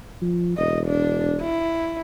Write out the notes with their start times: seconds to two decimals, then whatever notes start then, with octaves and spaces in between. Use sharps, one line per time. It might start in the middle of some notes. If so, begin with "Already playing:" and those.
0.21 F3
0.58 E1 D#5
0.87 D4
1.41 E4